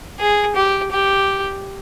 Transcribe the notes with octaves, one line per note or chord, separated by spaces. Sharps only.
G#4
G4
G4